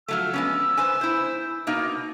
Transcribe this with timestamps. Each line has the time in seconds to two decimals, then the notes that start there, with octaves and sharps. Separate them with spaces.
0.08 F3 F#3 A3 E6
0.34 G#3 B3 C#4
0.77 B4 C5 G#5
1.01 E4 C5
1.67 B2 A#3 D#4